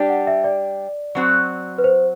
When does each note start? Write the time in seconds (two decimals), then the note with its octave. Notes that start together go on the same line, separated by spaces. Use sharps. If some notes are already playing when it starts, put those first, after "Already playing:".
Already playing: G3 D4 G4
0.09 F#5
0.27 E5
0.44 D5
1.15 F#3 C4 F#4
1.78 B4
1.84 C5